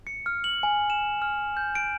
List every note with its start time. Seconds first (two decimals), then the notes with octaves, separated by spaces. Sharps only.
0.07 C#7
0.26 F6
0.44 F#7
0.63 G#5
0.90 E7
1.22 F6
1.57 G6
1.75 D7